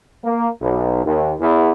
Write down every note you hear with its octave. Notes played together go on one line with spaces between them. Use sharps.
A#3
B1
D#2
E2